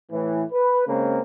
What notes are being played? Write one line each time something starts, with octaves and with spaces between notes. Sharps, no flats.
A2 E3
B4
C#3 G#3 A#3 C4